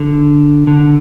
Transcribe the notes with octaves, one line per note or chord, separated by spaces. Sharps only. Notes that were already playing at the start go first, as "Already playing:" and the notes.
Already playing: D3
D3